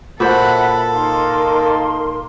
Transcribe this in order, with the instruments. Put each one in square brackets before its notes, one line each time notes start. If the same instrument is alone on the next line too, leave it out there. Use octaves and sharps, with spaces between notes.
[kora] A#2 F#4 C5 [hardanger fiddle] A4 [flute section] C#5 E5 [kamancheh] F#5 B5
[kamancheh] A#3 [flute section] D#4 A#4 C6